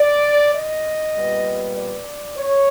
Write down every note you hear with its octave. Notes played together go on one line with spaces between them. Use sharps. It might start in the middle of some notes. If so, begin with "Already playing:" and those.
Already playing: D5
D#5
A#2 G3 B3
D5
C#5